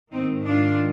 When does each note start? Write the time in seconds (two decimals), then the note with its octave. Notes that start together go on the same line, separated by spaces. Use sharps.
0.12 G#2 D#3 C4 D#4
0.45 D4 F4